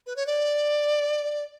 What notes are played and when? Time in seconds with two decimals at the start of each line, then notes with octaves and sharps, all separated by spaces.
0.06 B4
0.16 C#5
0.27 D5